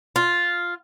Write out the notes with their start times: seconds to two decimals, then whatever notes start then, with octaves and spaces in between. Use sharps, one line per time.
0.16 F4